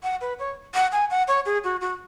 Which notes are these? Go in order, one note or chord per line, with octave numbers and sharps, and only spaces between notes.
F#5
B4
C#5
F#5
G#5
F#5
C#5
G#4
F#4
F#4